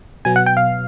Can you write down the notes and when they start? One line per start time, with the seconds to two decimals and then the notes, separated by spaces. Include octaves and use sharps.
0.25 B2 F#3 B3 G#5
0.36 F#5
0.46 G5
0.57 F5